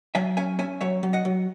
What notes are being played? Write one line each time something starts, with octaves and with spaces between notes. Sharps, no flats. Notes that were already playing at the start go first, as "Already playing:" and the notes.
F#3 E5 G#5
C#4 E5 G#5
C#4 E5 G#5
F#3 C#5 E5
F#3
D#5 F#5
F#3